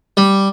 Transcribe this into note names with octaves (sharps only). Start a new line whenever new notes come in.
G3